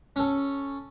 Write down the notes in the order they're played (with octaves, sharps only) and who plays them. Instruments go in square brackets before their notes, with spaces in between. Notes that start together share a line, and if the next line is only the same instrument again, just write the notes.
[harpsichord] C#4 A4